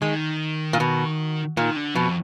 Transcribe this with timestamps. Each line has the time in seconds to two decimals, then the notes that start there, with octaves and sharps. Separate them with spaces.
0.02 D#3 G#3
0.73 A#2
0.80 B2
1.57 A#2 D#3
1.76 D3
1.95 F2 B2